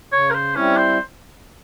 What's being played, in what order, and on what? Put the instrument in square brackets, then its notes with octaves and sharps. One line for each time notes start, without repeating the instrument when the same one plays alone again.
[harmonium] C#3 [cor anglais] C#5
[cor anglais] A#4
C5
[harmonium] G3 C4 E4 [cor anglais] C#4
[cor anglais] C5